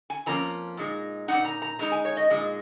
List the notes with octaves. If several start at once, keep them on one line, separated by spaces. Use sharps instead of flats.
G#5
F2 F3 A#3 C#4 A#5
A#2 G#3 D#4
A#2 G#3 D#4 F#5
A#5
A#5
A#2 G#3 D#4 A#5
G#5
C#5
D#5
A#2 G#3 D#4